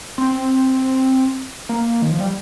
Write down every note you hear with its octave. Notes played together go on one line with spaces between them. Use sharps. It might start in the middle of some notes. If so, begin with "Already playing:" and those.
C4
A#3
D#3
F3
G3